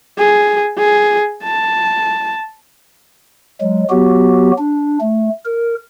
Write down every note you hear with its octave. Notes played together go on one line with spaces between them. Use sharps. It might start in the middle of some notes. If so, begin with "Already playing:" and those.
G#4
G#4
A5
F#3 G#3
F#3 B3 F#4 G4
D4
A3
A#4